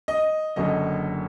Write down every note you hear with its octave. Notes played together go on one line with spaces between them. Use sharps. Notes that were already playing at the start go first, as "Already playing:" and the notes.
D#5
F#1 F#2 D3 D#5